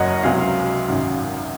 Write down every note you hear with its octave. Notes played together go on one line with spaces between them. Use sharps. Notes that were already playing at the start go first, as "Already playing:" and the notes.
Already playing: F#1 F#2 C#3 F#3 A#4 C#5 D#5 F#5
C#2 C3 F#3 F5 G#5
G#1 F#2 C#3